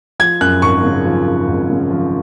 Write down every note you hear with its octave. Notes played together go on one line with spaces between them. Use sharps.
F3 G#6
F#2 F#6
G#1 C#6
C#3
F3
F#2
G#1
C#3
F3